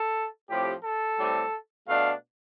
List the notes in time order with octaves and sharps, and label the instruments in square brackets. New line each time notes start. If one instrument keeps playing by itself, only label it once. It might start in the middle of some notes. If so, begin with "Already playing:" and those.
Already playing: [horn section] A4
A2 F3 C4 G4
A4
A2 G3 C4
B2 A3 D4 F5